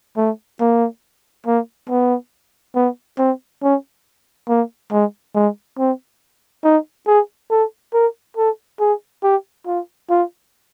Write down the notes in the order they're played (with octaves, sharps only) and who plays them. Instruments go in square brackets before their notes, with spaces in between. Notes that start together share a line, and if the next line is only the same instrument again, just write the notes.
[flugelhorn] A3
A#3
A#3
B3
B3
C4
C#4
A#3
G#3
G#3
C4
D#4
G#4
A4
A#4
A4
G#4
G4
F4
F4